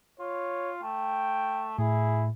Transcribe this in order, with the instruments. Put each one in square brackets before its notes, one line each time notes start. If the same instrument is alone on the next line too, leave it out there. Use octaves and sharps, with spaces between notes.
[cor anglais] F4 [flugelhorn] C#5
[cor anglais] A3 [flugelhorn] G5
[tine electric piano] A2 [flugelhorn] E4 [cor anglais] G#4